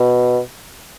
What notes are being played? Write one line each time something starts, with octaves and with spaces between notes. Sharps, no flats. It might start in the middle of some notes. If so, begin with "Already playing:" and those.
Already playing: B2